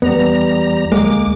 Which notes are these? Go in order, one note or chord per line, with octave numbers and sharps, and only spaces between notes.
E2 G3 B3 A#5
D2 G#3 A#3 D6